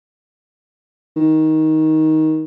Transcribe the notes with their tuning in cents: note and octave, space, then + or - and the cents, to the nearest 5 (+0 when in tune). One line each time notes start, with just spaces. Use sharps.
D#3 +15